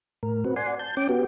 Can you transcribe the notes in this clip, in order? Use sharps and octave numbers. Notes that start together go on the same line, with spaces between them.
A2 A#4
C4 F#4 B4
D5 F#5 G#5 C6
A5 G6
C#4 G5 D6
B3 F#4 G4